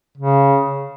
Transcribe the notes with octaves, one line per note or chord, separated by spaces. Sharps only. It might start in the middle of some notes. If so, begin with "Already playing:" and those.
C#3